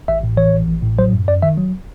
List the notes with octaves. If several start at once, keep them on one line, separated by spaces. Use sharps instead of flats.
A1 E5
A2
E3 C#5
A1
A1
A2
F#3 C5
F#2
F#2 D5
D#3 E5
F#3